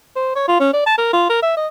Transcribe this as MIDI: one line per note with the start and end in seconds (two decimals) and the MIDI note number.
0.16 0.31 72
0.36 0.47 73
0.48 0.59 65
0.60 0.70 61
0.74 0.82 74
0.86 0.95 81
0.98 1.11 70
1.13 1.25 65
1.29 1.39 70
1.43 1.55 76
1.57 1.67 75